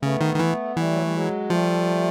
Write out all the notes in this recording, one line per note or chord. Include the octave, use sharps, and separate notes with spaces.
C#3 A3 B3
D#3
D#3
E3
E3 G3 A3
F#3
G3
F#3 G#3
F3 G3 A3